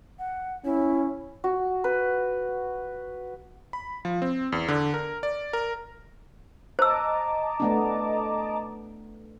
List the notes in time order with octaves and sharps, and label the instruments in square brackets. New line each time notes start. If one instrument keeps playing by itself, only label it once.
[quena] F#5
[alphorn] C#4 [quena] E4
[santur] F#4
B4
[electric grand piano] B5
F3
C4
E2
D3
A#4
D5
A#4
[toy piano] C5 E6 [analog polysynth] D#5 A5 D6 [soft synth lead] A#5
[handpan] A3 B3 D4